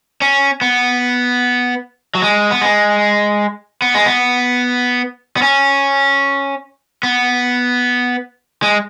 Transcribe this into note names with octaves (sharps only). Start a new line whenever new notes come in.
C#4
B3
F#3
G#3
B3
G#3
B3
G#3
B3
B3
C#4
B3
G#3